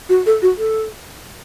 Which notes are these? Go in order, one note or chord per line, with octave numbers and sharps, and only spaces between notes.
F#4
A4
F#4
A4